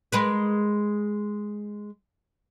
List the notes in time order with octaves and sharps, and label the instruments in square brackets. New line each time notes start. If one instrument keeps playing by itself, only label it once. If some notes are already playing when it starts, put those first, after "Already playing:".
[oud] G#3 A#4 B4